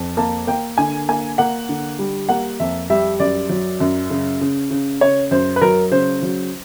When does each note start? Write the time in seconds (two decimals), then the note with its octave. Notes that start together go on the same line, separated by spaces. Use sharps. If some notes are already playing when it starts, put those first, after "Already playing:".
Already playing: F2
0.17 A#3 A5
0.47 A#3 G5
0.78 D3 G#5
1.09 A#3 G#5
1.38 A#3 F#5
1.69 D3
1.99 G3
2.29 A#3 F#5
2.60 F2 E5
2.90 G3 E5
3.19 F#2 D5
3.49 F#3
3.80 F#2
4.10 C#3
4.41 C#3
4.71 C#3
5.01 C#3 C#5
5.31 F#2 C5
5.56 B4
5.62 F#3 A#4
5.92 C#3 C5
6.23 F#3